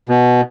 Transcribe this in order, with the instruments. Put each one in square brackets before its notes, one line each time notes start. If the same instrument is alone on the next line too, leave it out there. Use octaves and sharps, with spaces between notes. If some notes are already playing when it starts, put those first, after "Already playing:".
[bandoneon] B2